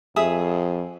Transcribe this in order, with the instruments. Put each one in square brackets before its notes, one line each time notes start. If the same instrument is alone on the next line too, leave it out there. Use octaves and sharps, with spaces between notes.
[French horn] F2 [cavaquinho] G#4 E5 D#6